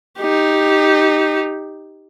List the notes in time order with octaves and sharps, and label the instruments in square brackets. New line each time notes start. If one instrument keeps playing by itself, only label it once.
[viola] D#4 G4